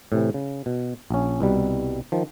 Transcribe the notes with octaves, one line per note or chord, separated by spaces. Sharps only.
A2 C3 E3
C#3
B2
A#1 C#4
C2 B2 G3
D#3 F3